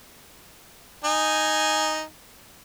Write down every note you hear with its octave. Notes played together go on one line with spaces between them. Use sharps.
D#4 G#5